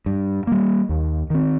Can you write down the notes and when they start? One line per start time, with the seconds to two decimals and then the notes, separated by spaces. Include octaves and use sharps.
0.06 G2
0.47 G3 A#3
0.89 D#2
1.30 D#3 C4